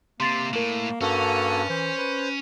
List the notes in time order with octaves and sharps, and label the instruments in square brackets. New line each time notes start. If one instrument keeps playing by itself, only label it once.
[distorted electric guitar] C3 [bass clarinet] A#3 [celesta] C6 A6 C7
[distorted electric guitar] A2 [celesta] A#4 E7
[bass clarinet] G2 [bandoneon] A#3 F#4 A4 [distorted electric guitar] C#4
[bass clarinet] E3 [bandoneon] C5
[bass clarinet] B4